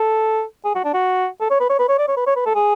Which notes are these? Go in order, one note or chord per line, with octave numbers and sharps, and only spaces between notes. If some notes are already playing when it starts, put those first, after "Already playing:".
Already playing: A4
G#4
F#4
D4
F#4
A4
C#5
B4
C#5
B4
C#5
D5
C#5
B4
C#5
B4
A4
G#4